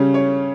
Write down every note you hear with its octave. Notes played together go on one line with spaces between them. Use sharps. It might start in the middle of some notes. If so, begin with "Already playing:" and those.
Already playing: C#3 G3 C#4
C#5